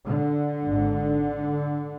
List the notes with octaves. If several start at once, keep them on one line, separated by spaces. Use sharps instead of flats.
D3
G#1 G#2